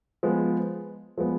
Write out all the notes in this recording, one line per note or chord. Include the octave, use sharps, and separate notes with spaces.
F3 G#3 B3
F3 G#3 B3